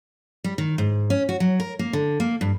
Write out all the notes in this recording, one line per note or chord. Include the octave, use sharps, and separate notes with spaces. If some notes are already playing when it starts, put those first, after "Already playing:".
G3
D#3
G#2
C#4
F#4
F#3
A#4
A#3
D3
A#3
G2